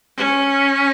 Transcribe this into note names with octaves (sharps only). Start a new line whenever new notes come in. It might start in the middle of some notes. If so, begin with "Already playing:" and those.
C#4